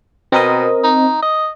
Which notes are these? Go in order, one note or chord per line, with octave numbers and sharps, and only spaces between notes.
B2 C4 A#4 D#5
D#4
D#5